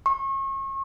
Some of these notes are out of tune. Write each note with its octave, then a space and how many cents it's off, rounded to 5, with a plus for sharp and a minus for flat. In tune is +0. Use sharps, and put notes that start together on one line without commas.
C#6 -35